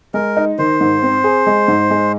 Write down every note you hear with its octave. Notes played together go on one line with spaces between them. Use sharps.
G#3 A#4
D#4
D#3 C5
G#2
C4
G#4
G#3
G#2
G#3